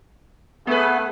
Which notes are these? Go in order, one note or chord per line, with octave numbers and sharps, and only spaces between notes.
A3 B3 G#4 B4